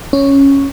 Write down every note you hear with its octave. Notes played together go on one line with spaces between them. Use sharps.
C#4